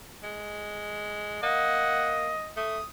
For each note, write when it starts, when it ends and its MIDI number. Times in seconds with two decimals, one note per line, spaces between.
0.23 1.42 56
1.43 2.32 58
1.43 2.51 75
1.43 2.18 78
2.56 2.78 57
2.56 2.85 87